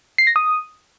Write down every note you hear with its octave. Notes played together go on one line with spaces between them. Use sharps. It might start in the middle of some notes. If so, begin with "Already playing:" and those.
C7
A#6
D#6